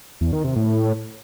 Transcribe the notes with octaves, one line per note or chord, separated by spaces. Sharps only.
E2
D#3
C3
A2